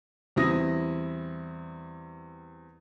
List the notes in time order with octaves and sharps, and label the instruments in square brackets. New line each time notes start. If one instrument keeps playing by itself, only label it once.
[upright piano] E2 G3 C4 E4 D#6 A#6